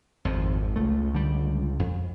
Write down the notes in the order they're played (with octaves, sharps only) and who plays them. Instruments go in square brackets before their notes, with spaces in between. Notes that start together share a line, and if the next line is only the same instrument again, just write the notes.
[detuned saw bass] G#1 [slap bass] F2 F3
[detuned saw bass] C#2 [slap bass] A3
[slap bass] D3 G3
F2